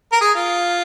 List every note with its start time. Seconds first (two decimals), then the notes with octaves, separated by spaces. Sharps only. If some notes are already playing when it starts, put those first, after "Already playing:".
0.12 A#4
0.21 G#4
0.35 F4